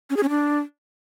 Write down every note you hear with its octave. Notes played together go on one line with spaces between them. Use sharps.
C#4
G#4
C#4
D4